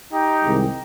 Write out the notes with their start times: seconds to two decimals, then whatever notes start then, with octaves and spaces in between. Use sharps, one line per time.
0.12 D#4 G4
0.42 C2 C3 D#3 G#3